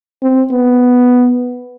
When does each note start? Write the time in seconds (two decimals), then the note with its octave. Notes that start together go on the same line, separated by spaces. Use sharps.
0.23 C4
0.52 B3